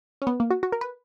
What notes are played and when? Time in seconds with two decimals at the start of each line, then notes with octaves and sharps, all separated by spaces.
0.22 C#4
0.27 B3
0.40 A#3
0.51 F#4
0.63 F#4
0.72 A#4
0.81 B4